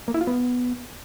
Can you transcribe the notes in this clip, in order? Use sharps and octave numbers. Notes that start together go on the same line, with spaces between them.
A#3
E4
F4
B3